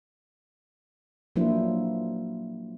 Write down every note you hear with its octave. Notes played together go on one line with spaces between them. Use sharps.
F3 F#3 A#3 D4 E4 C5